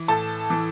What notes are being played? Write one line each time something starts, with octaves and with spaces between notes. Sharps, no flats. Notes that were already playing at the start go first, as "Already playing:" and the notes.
Already playing: E3
A2 A4 A5
E3